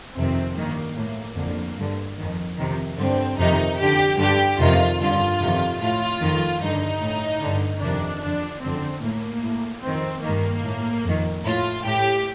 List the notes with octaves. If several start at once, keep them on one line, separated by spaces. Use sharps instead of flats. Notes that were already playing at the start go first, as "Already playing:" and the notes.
F2 C3 D#3 C4
G2 D#3 A#3
A2 A#3
F2 D3
G2 D3
F2 D#3
F2 C3 D#3
G2 D3 C4
F2 C3 D#3 D#4
F2 D3 G4
G2 D3 G4
F2 C3 D#3 F4
G2 D3 F4
F2 C3 D#3
A2 F4
F2 D#3
G2 D3 D#4
A2
G2 D3
F2 C3 D#3 D4
F2 D3 D4
F2 D3 C4
A2 A#3
A2
F2 D#3 C4
G2 D#3 A#3
A2
F2 D#3
A2 F4
A2 G4